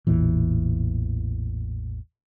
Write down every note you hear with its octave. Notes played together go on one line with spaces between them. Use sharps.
A1 E2 A#2 E3